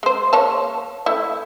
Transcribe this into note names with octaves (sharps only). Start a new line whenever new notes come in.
G#3 C5
A#3 C#5 A5
A3 E4